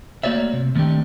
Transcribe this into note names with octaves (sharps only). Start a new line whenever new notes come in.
A3 A#3 F#4 C#5 D5 E5
C3
D#3 A3 C4 D4 G4